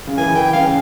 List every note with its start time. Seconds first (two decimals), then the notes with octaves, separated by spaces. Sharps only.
0.07 C#3
0.18 E3 G#5
0.35 E3 G5
0.53 C#3 F5